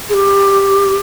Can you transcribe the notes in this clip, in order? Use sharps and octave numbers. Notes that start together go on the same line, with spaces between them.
G#4
G4